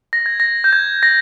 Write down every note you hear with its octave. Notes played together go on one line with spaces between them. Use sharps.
A#6
G#6
A#6
G6
G#6
A#6